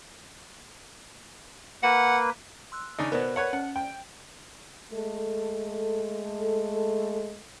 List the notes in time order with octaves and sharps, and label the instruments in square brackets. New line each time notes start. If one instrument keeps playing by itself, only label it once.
[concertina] A#3 B4 [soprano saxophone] F#5
[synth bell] C6 E6 F#6
[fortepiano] C#3 D4 D#4
[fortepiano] B2 B3 [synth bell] A#4 C5 D5
[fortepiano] B4 C#5 F#5
[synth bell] C#4 [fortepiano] F#5
[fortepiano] G5
[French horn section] G#3 A3 A4